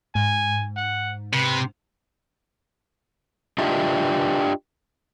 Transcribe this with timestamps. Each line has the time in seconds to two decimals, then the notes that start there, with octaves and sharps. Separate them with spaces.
0.15 G#2 G#5
0.77 F#5
1.33 C3 B4
3.58 D4 F4 G4 D#5 E5